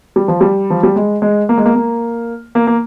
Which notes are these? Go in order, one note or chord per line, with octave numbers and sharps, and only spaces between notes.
G3
F3
G3
F3
G3
G#3
G#3
A#3
G#3
A#3
A#3
A#3
A#3